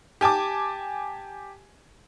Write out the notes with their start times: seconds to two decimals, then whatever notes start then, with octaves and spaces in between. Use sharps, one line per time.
0.21 G4 G#5 A5 D6